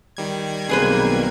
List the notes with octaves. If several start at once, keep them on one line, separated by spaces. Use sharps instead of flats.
D#3 G3 G#6
B1 C3 A#3 G#4 B4 C5